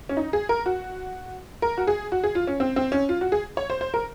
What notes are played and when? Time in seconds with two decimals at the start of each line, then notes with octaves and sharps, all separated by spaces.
0.09 C#4
0.17 D#4
0.33 G#4
0.49 A#4
0.66 F#4
1.62 A#4
1.77 F#4
1.87 G#4
2.12 F#4
2.24 G#4
2.35 F4
2.47 C#4
2.60 C4
2.76 C4
2.92 C#4
3.09 F4
3.21 F#4
3.32 G#4
3.57 C#5
3.70 C5
3.81 C5
3.94 A#4